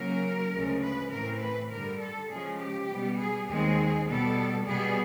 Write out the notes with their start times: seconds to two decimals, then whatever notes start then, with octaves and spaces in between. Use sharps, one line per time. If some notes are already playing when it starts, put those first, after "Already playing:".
Already playing: C#3 F#3 A#3 A#4
0.52 D2 C#3 F3 G#3
0.81 B4
1.11 A2 E3 A3 C4 A#4
1.40 B4
1.70 G2 D3 G3 A#4
2.00 A4
2.29 C#3 F3 G#3 C#4 G#4
2.59 G4
2.89 B2 G3 B3
3.18 G#4
3.47 D#2 D#3 G#3 C4 G#4
4.06 B2 G3 B3 A4
4.66 B2 G3 B3 G#4